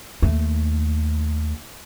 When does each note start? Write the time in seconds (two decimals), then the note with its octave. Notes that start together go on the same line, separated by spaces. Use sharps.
0.22 D#2 A3